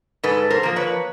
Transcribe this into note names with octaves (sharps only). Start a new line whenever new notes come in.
G#2 A4 B4
A#4 C5
F3 A#3
B4 C#5